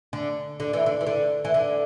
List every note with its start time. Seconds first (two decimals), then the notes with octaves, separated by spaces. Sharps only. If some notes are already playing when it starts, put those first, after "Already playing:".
0.13 D3
0.60 D3
0.73 E3
0.86 D3
1.01 E3
1.07 D3
1.45 E3
1.54 D3